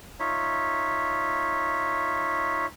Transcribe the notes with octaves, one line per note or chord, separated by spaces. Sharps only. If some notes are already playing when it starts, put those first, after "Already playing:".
D#4 F4 C#5 E5